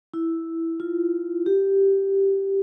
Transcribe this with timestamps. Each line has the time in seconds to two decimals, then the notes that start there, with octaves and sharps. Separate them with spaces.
0.14 E4
0.80 F4
1.46 G4